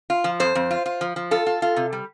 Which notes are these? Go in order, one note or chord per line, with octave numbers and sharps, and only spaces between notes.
F4
F3
F2 C5
F2
F4
F4
F3
F3
F4 A4
F4
F4
C3
G3